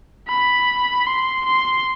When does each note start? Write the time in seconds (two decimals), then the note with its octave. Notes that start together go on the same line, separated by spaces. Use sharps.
0.28 B5
1.06 C6
1.45 C6